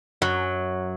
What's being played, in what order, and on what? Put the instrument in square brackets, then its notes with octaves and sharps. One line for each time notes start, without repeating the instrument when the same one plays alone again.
[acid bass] F#2 [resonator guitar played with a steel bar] F#3